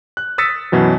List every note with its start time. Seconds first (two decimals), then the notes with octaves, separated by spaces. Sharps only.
0.17 F#6
0.38 D#6 E6 A6 B6 C#7
0.72 F#2 B2 E3 F#3